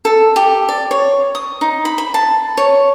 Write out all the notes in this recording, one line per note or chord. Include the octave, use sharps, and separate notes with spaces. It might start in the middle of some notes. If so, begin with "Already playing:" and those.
A4
G4
D5
C#5
D#6
D#4
B5
B5
A5
C#5